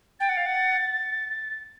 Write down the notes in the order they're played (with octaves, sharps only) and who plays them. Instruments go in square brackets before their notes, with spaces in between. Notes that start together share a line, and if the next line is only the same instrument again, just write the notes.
[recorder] G5 [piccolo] A6
[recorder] F#5
F5
F#5